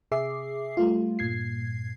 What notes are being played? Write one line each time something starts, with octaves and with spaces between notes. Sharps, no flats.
C3 G#4 E5 D6 C7
G3 A3 F4
G2 A#2 G#6 C7